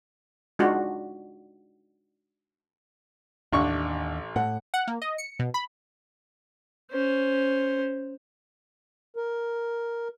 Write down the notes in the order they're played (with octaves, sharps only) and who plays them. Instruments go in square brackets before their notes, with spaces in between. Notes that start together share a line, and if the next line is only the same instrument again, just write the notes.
[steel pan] G#3 D4 D#4 F4 F#4
[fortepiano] A1 C#6 [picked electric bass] D#2 [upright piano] D4
[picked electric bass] A2 [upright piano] F#5
[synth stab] F#5
A#3
D#5
C#7
B2
B5
[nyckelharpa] C#4 C5
[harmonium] A#4